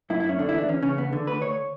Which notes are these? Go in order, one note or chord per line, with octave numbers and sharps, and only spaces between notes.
F#2 E4
E4
F#2
C#4
D3 D4
E4
E2 D4
E2 C#4
C#3 C#4
E2 B3
D3
D2 B4
D2 C#5